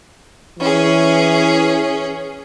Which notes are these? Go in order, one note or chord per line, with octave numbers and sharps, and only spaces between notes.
E3 C#4 G#4